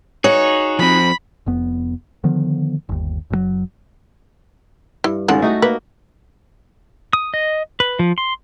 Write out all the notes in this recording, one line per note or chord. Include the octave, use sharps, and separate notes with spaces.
D#4 F#4 G#4 C#5
F3 C4 B5
F1 F2 B3
D3 D#3 F3 B3
G1 D#2
F#1 B2 F#3
G2 E4
G#1 C#2 G#3 A4 F#5
A3 D#4 F#4 D#5
A#3 B4
D#6
D#5
B4
F3
C6